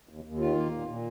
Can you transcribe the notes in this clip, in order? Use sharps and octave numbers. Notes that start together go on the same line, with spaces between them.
D#2
D#2
D#3 F4
A#3
A#2
A#2